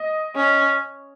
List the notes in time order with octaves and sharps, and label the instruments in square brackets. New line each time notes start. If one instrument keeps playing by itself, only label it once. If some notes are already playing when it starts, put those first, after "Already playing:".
Already playing: [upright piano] D#5
[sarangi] C#4